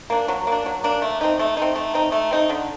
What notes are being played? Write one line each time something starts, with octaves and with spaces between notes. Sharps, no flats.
A#3 D4
F#3
A#3 D4
F#3
A#3 D4
A3
C4 D#4
A3
C4 D#4
A3
C4 D#4
A3
C4 D#4
D3